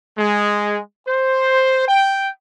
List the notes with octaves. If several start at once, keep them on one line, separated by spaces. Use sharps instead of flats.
G#3
C5
G5